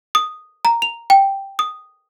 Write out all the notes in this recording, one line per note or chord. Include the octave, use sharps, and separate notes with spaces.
D#6
A#5
F7
G5
D#6